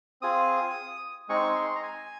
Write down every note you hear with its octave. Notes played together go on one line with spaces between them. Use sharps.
C4 F4 G#4 D#6
G#3 C4 D#4 G#4 C#6
C6
A#5
G#5